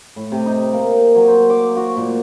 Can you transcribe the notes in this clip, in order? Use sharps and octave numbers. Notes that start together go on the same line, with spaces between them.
A2
C3
D#4
A#3
F#3
C5
D6
F#4
A#2